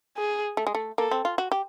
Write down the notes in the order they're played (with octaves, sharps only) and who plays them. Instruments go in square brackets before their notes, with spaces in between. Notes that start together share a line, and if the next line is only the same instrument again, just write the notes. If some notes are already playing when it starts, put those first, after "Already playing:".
[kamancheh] G#4
[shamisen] A3
G#3
A3
[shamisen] A#3 [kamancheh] A4
[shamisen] C4
F4
F#4
G4